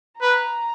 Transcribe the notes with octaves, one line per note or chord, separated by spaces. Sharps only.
B4 A#5